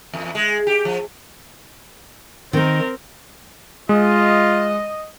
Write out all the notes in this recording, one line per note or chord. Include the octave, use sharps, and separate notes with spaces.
E2
G#3
G4
F3
D#3 C4 D#4 A#4
G#3 F4 D#5